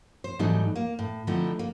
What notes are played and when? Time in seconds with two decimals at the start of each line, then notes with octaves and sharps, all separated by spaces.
0.24 C5
0.39 G#2 E3 F#3 G3 A3 D#4
0.76 A#3
0.99 A2
1.27 D3 F3 A3 C4 D#4 E4
1.59 A#3